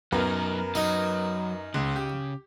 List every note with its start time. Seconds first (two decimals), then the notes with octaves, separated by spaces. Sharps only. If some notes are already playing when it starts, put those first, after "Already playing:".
0.12 F#2 F#3 B3 D#4 A#4
0.75 F#3 D#4
1.74 C#2 C#3
1.96 G4